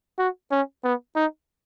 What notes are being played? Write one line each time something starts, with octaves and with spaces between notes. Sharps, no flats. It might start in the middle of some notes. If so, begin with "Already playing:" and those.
F#4
C#4
B3
D#4